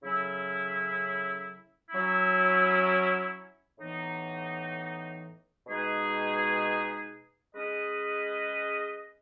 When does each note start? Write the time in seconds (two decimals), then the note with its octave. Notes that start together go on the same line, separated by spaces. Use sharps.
0.02 C#3 F#3 C#4 E4 A4
1.90 F#3 C#4 E4
3.79 A2 E3 B3 D#4
5.67 B2 G#3 D#4 G#4 B4
7.55 G#3 C#4 G#4 B4 D#5